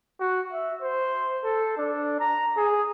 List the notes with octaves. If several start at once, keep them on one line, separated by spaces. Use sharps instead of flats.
F#4
E5
C5
A4
D4
A#5
G#4